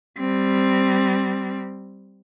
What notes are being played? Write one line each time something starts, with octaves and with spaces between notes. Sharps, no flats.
G3 C4